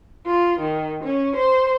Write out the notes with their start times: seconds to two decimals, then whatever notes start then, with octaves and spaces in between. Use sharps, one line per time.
0.26 F4
0.59 D#3
1.04 C#4
1.35 C5